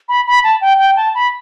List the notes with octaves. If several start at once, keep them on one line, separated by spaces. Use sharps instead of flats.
B5
B5
A5
G5
G5
A5
B5